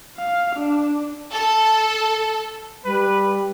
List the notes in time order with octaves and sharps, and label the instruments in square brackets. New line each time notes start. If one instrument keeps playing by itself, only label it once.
[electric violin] F5
D4
[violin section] A4
[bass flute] G3 [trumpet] B4